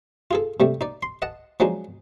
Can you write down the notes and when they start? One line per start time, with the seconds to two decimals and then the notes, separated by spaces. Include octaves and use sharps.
0.31 F4 G#4 A4
0.60 C3 G3 A3
0.81 D#4 D5
1.03 C6
1.22 D#5 F#5 A5
1.60 F3 F#3 G#3 D4 D#4